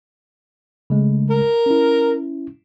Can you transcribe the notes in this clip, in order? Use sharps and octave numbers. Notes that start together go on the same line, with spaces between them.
C#3 G#3 A3
A#4
C#4 E4